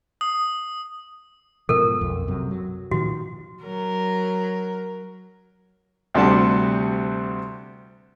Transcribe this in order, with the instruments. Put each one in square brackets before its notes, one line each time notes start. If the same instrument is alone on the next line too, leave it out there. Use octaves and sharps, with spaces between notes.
[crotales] D#6
[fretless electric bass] G#2 B2 F3 [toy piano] A4 A#4
[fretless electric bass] B1 F2
F#2 C3 F#3
F#3
[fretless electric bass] A#2 D#3 F3 [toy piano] F#4
[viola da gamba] F#3 A#4
[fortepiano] D2 C3 G3 D4 F#4 A5